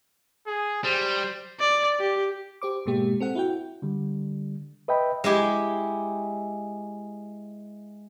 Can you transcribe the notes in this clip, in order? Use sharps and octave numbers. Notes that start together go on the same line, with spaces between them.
G#4
G3 C5
D5
G4
G4 C5 D6
G#2 B2 G#3 A#3 G4
C4 A4 F#5
E4 F#4 G5
D3 G3
B4 D#5 E5 G5 B5
G#3 E4 G4